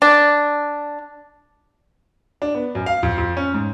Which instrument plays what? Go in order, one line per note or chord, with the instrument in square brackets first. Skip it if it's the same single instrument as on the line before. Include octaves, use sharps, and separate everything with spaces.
[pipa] D4
[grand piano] D4
B3
F#2
F5
F2
F2
C#4
G#2